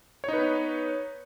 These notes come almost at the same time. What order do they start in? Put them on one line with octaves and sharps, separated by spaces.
C#5 D#4 B4 B3